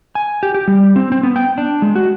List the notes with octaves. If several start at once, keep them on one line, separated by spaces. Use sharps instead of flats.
G#5
G4
G4
G3
C4
C4
B3
G5
D4
G#3
F#4